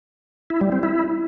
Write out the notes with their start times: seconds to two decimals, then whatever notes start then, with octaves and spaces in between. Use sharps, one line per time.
0.50 E4
0.61 G3
0.72 C4
0.83 E4